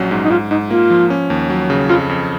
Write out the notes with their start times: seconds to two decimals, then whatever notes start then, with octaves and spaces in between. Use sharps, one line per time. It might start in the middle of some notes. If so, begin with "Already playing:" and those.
Already playing: A#1 F#3 C#4
0.11 G#2
0.25 D#4
0.30 G#2 F4
0.51 G#2 D#4
0.71 A#3 F4
0.90 F3
1.10 C#4
1.30 D#2
1.50 F#3
1.70 C#3
1.89 F2 F4
2.09 F2